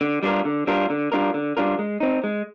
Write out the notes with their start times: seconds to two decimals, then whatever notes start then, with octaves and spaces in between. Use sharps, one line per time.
0.01 D3
0.23 G3 D4 F4 A#4
0.45 D3
0.67 G3 D4 F4 A#4
0.90 D3
1.12 G3 D4 F4 A#4
1.34 D3
1.57 G3 D4 F4 A#4
1.79 G#3
2.00 C4 D#4
2.24 G#3